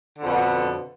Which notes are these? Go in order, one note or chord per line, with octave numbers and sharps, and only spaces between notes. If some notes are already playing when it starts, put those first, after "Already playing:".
F2 B2 D3